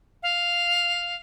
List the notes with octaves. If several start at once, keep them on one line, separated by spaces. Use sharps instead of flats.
F5